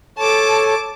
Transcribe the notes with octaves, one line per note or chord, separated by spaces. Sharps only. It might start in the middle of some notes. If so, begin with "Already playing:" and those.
A4 C#5 A5 D6